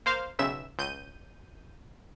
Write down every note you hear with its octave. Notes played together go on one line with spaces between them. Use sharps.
A#3 C5 F5
B1 C#3 E5 E7
C#2 G6 D#7